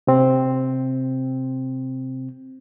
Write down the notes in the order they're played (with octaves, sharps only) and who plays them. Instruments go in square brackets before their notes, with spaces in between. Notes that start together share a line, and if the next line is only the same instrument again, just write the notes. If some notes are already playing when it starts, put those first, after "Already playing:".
[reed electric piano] C3 C4